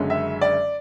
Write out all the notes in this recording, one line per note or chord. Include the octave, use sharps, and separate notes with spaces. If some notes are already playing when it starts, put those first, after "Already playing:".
Already playing: F#1 F#2 D3 G#3 C#4
E5
D5